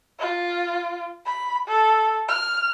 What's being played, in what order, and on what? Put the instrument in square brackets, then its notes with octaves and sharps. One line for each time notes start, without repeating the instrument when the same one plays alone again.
[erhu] F4
B5
A4
F6